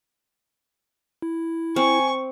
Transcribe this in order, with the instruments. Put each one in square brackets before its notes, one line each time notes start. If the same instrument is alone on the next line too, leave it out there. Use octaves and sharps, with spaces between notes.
[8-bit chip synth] E4
[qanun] C4 [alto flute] G#5 [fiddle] C#6